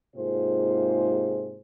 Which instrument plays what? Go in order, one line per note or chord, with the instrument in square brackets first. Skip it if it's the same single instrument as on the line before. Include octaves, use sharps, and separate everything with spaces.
[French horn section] G#2 C3 A#3 F4 G#4 C5